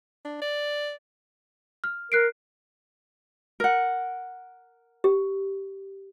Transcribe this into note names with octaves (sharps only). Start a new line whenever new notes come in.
D4
D5
F6
A#4 F#6 C7 D7
A#4 F#5
G4